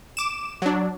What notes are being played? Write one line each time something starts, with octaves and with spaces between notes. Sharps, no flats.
D6 E7
F#3 D4